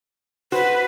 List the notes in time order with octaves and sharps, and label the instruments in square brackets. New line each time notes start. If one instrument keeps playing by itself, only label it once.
[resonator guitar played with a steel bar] F#4 C5 [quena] B4